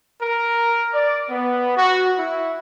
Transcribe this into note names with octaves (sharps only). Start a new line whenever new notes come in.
A#4
D5
B3
F#4
E4